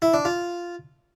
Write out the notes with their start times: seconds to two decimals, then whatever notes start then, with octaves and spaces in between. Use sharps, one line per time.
0.02 E4
0.14 D4
0.25 F4